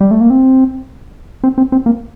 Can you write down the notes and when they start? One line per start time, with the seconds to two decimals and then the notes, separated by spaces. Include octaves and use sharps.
0.01 G3
0.11 A3
0.21 A#3
0.30 C4
1.44 C4
1.58 C4
1.72 C4
1.86 A#3